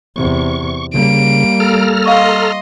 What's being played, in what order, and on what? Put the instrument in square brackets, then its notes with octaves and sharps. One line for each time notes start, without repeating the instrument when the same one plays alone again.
[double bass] E2 C3 [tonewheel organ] C#6
[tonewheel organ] C#3 [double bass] G3 A#3 [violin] D7
[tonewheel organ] A4 A#5 F6
[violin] D#5 C6 [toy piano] F5 C#6 E6